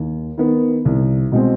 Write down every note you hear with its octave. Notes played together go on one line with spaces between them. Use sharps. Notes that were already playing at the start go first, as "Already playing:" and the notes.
Already playing: D#2
D#3 B3
C2
B2 G#3 C4